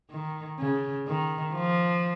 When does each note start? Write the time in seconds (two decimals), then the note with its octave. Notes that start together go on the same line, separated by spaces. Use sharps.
0.11 D#3
0.59 C#3
1.08 D#3
1.55 F3